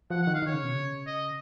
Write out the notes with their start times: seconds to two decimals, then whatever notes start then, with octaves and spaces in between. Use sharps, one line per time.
0.10 F3 F#5
0.23 D#3 F#5
0.35 F5
0.42 D#3 C#5
0.54 C#3
0.63 B2
0.75 C#3
1.07 D#5